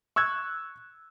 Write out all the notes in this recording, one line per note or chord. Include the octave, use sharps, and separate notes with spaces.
C#6 E6 F#6 G#6